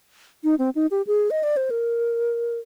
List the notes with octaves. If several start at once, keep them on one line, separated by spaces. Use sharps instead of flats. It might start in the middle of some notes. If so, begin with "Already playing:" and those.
D#4
C4
D#4
G4
G#4
D#5
D5
C5
A#4